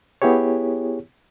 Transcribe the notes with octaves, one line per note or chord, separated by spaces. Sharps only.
B3 E4 G4 G#4 C#5